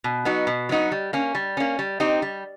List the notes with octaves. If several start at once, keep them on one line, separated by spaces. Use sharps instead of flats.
B2
F#3 B3 D#4 F#4
B2
F#3 B3 D#4 F#4
G3
A#3 C#4
G3
A#3 C#4
G3
C4 D#4 G4
G3